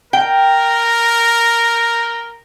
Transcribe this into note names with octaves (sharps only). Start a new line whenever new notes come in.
A#4 G5